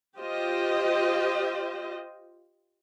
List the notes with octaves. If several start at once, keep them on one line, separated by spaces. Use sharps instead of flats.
F4 G4 C5 D#5